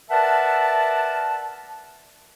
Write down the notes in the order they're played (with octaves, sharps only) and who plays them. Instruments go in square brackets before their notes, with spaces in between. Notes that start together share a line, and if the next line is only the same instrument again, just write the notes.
[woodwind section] A#4 B4 D5 E5 F#5 A5